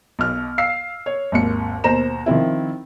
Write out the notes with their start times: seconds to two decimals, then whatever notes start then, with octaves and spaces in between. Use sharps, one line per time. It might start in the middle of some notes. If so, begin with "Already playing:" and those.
0.19 B1 B2 F6
0.58 F5 E6 C7
1.06 C#5
1.32 G#1 D#2 C#7
1.84 D#2 B2 C5 A#5 E7
2.26 D#3 F3 C4 E4